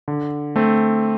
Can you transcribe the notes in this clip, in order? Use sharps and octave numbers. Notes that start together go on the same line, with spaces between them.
D3
A3 C4